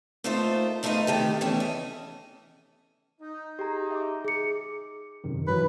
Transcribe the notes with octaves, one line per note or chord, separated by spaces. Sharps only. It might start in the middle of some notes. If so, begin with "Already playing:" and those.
A3 A#3 D#4 F4 A4 C5
F3 A3 D#4 F4 B4 D#5
C3 D#3 A3 G4
E3 A3 B3 C#4 E4
D#5
D#4
G4 G#4 A#5
E5 D6
G#4 C#7
F#2 C3 D#3
G2 E3 F#3 B4